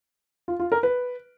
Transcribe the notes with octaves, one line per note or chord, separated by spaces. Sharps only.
F4
F4
A#4
B4